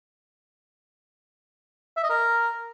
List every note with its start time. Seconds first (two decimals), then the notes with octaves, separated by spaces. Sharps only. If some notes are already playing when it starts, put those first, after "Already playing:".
1.97 E5
2.04 D#5
2.10 A#4